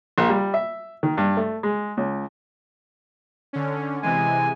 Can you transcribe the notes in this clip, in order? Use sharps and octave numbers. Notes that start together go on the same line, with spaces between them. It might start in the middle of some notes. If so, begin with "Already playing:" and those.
A#1
G3
E5
D#3
G2
A3
G#3
C#2
D3 C#4
C3 E3 G#3 G#5